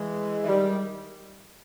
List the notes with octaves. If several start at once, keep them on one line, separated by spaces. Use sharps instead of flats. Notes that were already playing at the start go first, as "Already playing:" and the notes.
Already playing: E3 G#3
E3
D#3 G3